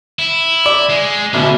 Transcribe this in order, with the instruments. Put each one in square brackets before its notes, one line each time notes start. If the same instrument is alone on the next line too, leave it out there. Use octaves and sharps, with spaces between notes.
[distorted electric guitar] E4
[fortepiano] D5
[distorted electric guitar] G#3
[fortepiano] A1 B2 [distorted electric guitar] D3